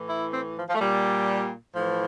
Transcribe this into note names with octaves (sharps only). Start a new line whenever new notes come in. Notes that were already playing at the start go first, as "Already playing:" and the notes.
Already playing: A2 E3
E4
C4
F3
F3
A3
A#2 G3
A2 E3 F3